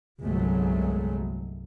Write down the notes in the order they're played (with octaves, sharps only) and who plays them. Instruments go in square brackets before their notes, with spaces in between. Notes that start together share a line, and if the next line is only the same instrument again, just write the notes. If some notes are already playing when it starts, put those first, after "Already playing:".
[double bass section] G1 C2 F#3 G#3 A3